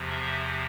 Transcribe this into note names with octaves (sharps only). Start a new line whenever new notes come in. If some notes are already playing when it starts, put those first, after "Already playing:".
Already playing: E2 C3 F3
E5